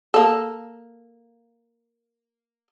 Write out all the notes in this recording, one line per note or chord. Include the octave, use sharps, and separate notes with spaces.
A#3 A4